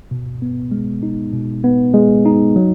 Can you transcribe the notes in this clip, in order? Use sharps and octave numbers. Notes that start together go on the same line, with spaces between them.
B2
B3
G#3
D#4
B2
B3
G#3
D#4
F#3